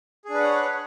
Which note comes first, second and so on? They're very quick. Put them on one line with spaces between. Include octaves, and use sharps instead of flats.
G#4 D4 B4 F#5 C#5